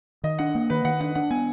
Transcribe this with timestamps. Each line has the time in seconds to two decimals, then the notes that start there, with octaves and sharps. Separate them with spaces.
0.24 D#3 D#5
0.39 D4 F#5
0.55 A#3
0.70 D#3 B4
0.85 D#3 F#5
1.01 D4 F#5
1.15 D4 F#5
1.31 B3 G#5